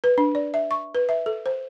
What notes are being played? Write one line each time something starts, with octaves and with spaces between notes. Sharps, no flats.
B4
D4
D5
E5
C#6
B4
E5
A4
C5